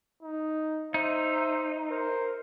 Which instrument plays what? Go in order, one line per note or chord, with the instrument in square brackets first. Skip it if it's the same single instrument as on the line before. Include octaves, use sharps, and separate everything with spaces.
[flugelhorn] D#4
[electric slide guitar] D#4 [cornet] C5 [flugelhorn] E5
[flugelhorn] A#4 [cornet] C5